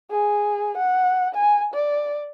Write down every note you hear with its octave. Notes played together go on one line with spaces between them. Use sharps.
G#4
F#5
G#5
D5